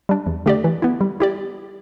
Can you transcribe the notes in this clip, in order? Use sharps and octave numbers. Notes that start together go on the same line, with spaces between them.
G3 D4
E2
D3 A3 G4 D5
E3
B3 E4
G3
E4 G4 D5